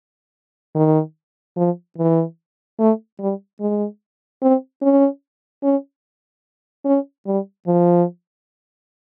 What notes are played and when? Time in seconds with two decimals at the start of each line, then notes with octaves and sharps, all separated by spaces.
0.75 D#3
1.57 F3
1.98 E3
2.79 A3
3.19 G3
3.60 G#3
4.42 C4
4.82 C#4
5.63 C#4
6.85 C#4
7.26 G3
7.67 F3